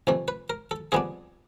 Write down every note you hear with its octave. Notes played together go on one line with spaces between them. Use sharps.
F2 C3 E3 A3
B4
A#4
A4
F2 D3 G3 B3 D4 G#4